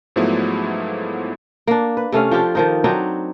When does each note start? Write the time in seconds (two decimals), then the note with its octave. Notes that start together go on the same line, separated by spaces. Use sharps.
0.16 G#2 F3 F#3 A3 B3 E4
1.67 A#3 D4
1.97 B4
2.12 C3 A3 C#4 F5
2.31 F3 D4 F4 G4
2.55 D#3 F3 D#4
2.84 F#3 C4 D4 D#4